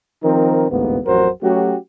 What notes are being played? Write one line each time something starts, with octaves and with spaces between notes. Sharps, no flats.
D#3 F3 C4 D#4 A#4
A1 D2 G#2 A#3 B3
A1 F2 F#3 F#4 A#4 C5
F#3 A3 C#4 F#4 G4